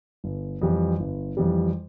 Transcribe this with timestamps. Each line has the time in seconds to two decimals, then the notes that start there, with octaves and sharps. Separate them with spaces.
0.24 G1
0.62 F2 E3 G3
1.00 G1
1.37 F2 E3 G3